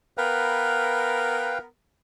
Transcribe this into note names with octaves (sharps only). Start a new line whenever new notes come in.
B3 A#4 B4 F5 G5